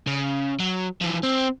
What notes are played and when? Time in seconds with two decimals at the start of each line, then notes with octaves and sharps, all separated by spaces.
0.07 C#3
0.60 F#3
1.01 E3 F3
1.23 C4